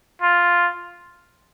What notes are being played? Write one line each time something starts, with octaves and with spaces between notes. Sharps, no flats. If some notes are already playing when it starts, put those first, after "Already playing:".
F4